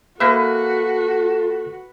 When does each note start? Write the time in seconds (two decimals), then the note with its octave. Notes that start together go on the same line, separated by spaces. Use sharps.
0.20 A#3 F#4 A4 B4 E5